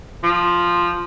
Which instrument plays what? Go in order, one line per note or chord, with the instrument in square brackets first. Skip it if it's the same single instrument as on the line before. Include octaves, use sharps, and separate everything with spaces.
[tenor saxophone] F3